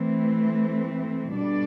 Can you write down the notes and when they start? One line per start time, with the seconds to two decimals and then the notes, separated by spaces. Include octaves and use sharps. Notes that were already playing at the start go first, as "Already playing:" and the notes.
Already playing: E3 A3 C4
1.35 B2 G3 D4 A4 D5